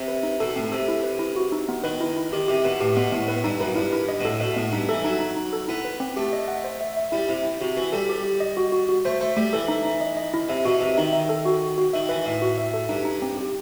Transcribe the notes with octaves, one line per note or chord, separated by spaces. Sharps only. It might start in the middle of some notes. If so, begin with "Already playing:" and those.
Already playing: C3
B4
D#4
B2 A4
A2 C4
C3 A4
E4
B4
E4
F#4
D#4
B3
D#3 B4
E4
E4
D#3 G4
C3 G4
B2 B4
A2 G4
B2 B3
A2 B3
A2 B4
G2 D#4
F#2 B4
G2 E4
E4
D#5
B2
A2 A4
B2 D#5
A2 B3
G2 D#4
E3 A4
F#3 D#4
D#4
D#4
A4
B3 E4
B4
C4
A3 G4
D#5
F#5
C5
E5
E5
G3 E4
C3 E4
E4
C3 F#4
E3 F#4
G3 A4
G4
G4
D#5
F#4
F#4
F#4
A3 C5
A3 C5
G3 A3
E3 A4
D#4
D#4
D#5
D#5
E4
C3 E5
B2 F#4
C3 E5
D#3 D#4
E5
A4
F#4
F#4
F#4
D#3 E5
E3 B4
A2 E5
F#4
E5
A4
G2 D#4
D#4
C4
G4